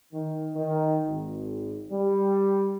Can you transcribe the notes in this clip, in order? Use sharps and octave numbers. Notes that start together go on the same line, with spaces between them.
D#3
D#3
G#1
G3